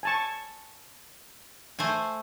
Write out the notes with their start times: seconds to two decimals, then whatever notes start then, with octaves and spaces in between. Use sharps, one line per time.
0.03 G#5 A5 C#6
1.79 A3 C5 G#5